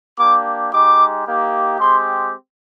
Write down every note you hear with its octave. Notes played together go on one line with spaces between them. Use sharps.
A#3 D4 G4 D6
G#3 D#4 G4 D6
A#3 D#4 G4
G#3 C4 G4 C6